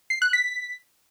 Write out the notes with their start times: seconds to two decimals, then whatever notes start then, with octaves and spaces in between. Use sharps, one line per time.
0.10 C7
0.22 F#6
0.33 B6